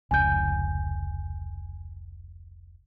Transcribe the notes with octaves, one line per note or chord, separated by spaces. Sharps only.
F1 C#2 G#5 G6